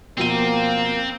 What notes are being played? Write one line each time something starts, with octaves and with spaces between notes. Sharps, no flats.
B2 F3 A#3 C4 D#7